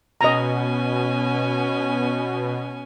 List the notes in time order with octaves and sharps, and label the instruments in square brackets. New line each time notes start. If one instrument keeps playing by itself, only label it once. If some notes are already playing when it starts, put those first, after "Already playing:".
[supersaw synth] B2 [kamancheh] C#4 G#5 [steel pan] D#5 A#5